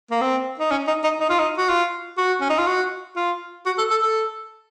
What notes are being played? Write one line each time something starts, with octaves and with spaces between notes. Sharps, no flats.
A#3
C4
D#4
C#4
D#4
D#4
D#4
F4
D#4
F#4
F4
F#4
C#4
D#4
F4
F#4
F4
F#4
A4
A4
A4